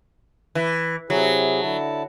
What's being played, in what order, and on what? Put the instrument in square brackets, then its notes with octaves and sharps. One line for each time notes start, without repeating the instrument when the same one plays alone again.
[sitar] E3
[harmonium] C3 E4 G#4 [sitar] F#3
[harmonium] D3 E4 A5